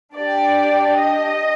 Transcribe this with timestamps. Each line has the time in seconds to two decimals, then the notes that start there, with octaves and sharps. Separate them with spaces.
0.15 D4 G4 D5
0.99 D#5